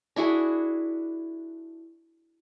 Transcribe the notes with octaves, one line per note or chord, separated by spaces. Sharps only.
D4 E4 F#4 G#4